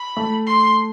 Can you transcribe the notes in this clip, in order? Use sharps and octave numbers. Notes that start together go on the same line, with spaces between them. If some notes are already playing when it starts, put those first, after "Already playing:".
Already playing: B5
A3
C6